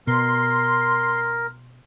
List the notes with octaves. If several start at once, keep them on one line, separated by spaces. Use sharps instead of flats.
B2 A#4 C6